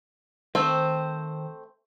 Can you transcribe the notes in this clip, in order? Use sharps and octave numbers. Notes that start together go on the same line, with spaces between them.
D#3 A3 C4 C5